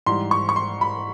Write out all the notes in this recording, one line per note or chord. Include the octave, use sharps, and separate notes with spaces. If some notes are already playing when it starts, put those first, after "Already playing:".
G#2 E3 G3 C6
C#6
C#6
C6
B5